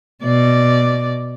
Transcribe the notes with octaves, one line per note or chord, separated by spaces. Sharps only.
B2 D5